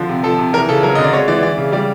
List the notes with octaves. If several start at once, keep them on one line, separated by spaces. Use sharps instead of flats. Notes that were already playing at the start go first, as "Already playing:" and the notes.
Already playing: D3 F3
C3
F3 A4
C3
E3 A#4
C#3 A4
F#3 A#4
D3 D#5
D5
G#3 C#5
E3 D5
E3 D5
C#3
G3 D5